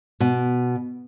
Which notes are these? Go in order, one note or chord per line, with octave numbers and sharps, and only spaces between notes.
B2